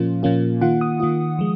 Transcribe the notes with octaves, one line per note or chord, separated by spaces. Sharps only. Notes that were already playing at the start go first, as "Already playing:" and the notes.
Already playing: A#2 F3 A#3 C#4 F4
A#2 F3 A#3 C#4 F4
D#3 A#3 F4 F#5
D#6
D#3 A#3 F4
F3 G#3